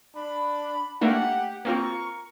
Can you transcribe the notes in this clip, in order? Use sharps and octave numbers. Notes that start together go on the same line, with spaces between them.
D4 B5
A3 A#3 D4 G4 F#5
A#3 C4 F4 A#4 C#6